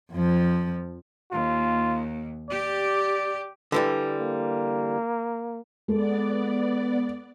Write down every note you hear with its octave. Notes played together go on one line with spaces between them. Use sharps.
F2 F3
D#2 F4
G4 D5
D3 E3 G3
A#3
G#3 B3 A4 D5